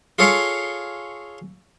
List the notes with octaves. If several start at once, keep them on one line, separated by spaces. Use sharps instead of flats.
F4 G#4 A4 C#5 F5 C6